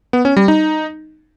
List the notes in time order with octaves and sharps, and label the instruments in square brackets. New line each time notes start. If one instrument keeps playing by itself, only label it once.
[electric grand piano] B3
C#4
G3
D#4